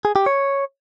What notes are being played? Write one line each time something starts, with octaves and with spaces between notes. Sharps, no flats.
G#4
G4
C#5